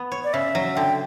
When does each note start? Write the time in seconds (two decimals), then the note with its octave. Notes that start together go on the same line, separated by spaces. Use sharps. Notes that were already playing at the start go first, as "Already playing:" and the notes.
Already playing: B3
0.12 C#5
0.24 D5
0.33 C#3 E5
0.55 F#3
0.76 D3 G5